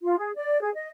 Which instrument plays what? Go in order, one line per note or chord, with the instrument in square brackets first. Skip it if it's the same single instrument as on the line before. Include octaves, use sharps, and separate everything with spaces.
[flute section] F4
G#4
D5
G#4
D#5